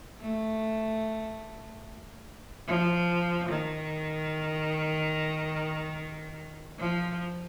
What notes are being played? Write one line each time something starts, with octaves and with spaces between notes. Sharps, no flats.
A3
F3
D#3
F3